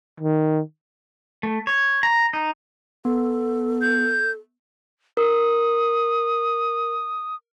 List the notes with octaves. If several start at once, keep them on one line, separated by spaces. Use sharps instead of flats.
D#3
A3
C#5
A#5
D#4
B3 A4
G6
A#4 D#6